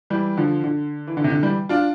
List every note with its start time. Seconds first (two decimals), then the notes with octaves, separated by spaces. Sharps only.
0.10 E3 G3
0.37 D3 F3
0.64 D3
1.07 E3
1.17 D3
1.24 C3
1.30 D3
1.43 E3 G3
1.69 D4 F4